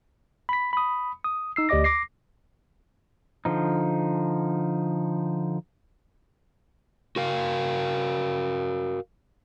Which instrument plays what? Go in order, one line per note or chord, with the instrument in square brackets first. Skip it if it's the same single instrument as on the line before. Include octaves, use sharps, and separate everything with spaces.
[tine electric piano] B5 B6
B5 D#6
D#6
D#4 E6 C7
D2 G4 D5 D#5 D6 A#6
D6 A#6 C7
[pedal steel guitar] D3 F3 D#4
[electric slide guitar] F#4 A#4 F5